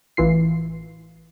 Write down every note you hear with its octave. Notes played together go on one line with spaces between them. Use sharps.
A1 E3 F4 C7